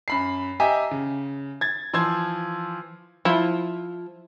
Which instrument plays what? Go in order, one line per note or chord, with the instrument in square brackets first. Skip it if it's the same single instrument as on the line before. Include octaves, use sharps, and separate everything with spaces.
[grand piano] F#2 B5 C7
G4 D#5 E5 G#5 A#5
C#3
G#6 A6
E3 F3 C6 E6 G#6
[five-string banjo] F3 [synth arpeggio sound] E4